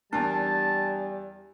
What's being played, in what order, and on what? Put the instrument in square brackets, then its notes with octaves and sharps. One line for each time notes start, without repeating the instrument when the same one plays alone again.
[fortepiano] E2 A#4 [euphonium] G3 [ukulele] D4 [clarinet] A5